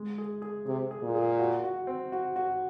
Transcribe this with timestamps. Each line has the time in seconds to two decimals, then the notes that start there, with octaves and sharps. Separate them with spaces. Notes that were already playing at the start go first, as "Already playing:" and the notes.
Already playing: G#3
0.18 G#4
0.42 G#4
0.66 C3 G#4
0.91 G#4
1.03 A#2
1.15 G#4
1.39 F#4
1.64 F#4
1.87 C4
2.12 F#4
2.36 F#4